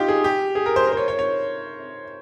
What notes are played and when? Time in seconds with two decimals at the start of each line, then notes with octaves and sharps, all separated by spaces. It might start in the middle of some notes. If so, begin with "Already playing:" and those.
Already playing: D#4 F4 G4
0.08 G#4
0.24 G4
0.55 G#4
0.66 A#4
0.76 C5
0.87 A#4
0.92 C5
0.97 C#5
1.08 C#5
1.19 C#5